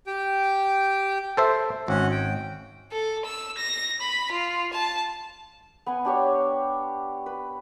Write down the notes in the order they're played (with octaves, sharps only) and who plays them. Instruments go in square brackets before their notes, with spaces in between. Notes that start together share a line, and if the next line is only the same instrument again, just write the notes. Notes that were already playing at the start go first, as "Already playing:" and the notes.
[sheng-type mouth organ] G4 G5
[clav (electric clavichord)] A4 C5 E5
[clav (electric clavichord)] G#1 [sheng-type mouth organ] C#4 F#4
[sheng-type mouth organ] G5
[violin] A4
E6
A#6
B5
F4
A5
[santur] B3 B4 G#5
D4 G4 C#5
B4